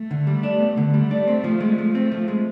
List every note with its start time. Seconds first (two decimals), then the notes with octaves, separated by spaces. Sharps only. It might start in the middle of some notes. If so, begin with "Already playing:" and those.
Already playing: A3
0.11 D3
0.27 G3
0.43 D4
0.60 B3
0.77 D3
0.93 G3 A3
1.11 D4
1.28 C4
1.44 F3
1.60 G#3
1.78 F3
1.95 A3 C4
2.12 F3
2.28 G#3